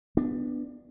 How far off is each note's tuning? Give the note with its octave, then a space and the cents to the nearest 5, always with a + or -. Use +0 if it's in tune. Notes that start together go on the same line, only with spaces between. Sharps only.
B3 +0 D4 +15